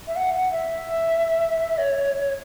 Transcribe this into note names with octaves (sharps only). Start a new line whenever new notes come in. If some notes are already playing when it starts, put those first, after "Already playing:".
E5
F#5
F#5
E5
C#5